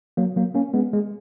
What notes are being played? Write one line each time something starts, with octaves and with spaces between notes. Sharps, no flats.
F#3 A#3
F#3 A#3
A#3 C#4
G#3 B3
G#3